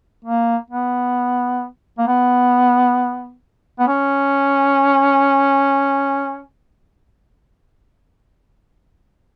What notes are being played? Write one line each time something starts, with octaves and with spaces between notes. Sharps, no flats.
A#3
B3
A#3
B3
B3
C#4